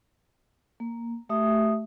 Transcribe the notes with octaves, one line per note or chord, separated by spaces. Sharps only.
A#3
A3 G4 E5 D#6